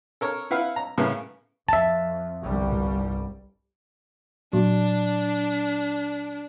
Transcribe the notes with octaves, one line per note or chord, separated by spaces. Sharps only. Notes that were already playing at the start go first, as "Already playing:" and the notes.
A4 A#4 C#5
E4 B4 F5 F#5
A#5
A2 C#3 A#3 B3
F2 E5 A5
G1 C2 G3
A#2 F#3 D4